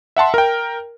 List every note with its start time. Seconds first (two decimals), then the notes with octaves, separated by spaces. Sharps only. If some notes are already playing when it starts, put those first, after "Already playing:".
0.17 E5 F#5 A5 C6
0.34 A#4 G5